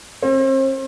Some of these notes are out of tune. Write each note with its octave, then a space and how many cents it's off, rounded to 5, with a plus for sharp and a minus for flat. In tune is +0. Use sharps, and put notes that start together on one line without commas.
C4 +40